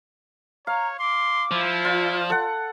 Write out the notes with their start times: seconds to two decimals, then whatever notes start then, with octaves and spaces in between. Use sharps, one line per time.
0.67 C#5 F5 A#5
0.99 C6 D6
1.51 F3 E4
1.85 F4 D5
2.30 A4 F#5